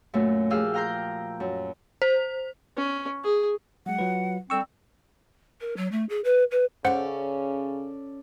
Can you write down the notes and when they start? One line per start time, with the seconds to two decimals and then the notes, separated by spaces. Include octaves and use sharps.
0.14 F#2 A#2 A3
0.50 F3 G4 G#4 F5 E6
0.74 F5 G5 A#5 C6 G6
1.40 F#2
2.02 C5
2.77 C#4
3.23 G#4
3.86 F#3 G#3 F#5
3.99 F#3 F4 B4
4.50 D3 G3 C4 C#6 E6
5.60 A#4
5.76 F#3
5.91 A3
6.09 G#4
6.24 B4
6.51 B4
6.85 C#3 C#4 A4 C5 D5 F#5